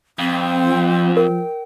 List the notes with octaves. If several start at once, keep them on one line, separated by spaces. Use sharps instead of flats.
F2 C4
F3
A#4 G5